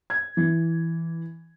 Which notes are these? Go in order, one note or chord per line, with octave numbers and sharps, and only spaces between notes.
G#6
E3